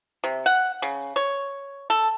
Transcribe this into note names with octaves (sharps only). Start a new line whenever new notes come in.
C3
F#5
C#3
C#5
A4